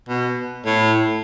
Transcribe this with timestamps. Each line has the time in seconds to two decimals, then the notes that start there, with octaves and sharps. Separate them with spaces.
0.09 B2
0.66 A2